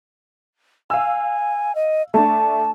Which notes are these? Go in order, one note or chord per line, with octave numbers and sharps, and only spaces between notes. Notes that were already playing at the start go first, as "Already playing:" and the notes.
F5 G#5 E6
D#5
A3 D4 A5